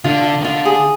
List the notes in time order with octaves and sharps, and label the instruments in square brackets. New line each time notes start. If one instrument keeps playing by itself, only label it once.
[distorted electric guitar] D3 [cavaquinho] F4
[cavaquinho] F4
[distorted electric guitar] D#3
[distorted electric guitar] D3 [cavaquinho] F4
[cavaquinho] G#4